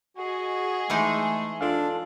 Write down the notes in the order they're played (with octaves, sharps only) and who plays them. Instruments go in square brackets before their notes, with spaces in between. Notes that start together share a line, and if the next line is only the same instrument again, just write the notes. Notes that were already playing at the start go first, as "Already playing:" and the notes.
[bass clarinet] F#4 [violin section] G#4 D#5
[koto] E3 G#3 D#4 [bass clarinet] A3
[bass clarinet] D4 [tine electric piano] F4 A4 F5